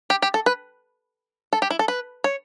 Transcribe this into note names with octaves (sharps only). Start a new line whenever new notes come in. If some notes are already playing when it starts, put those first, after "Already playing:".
G4
G4
A4
B4
A4
G4
E4
A4
B4
C#5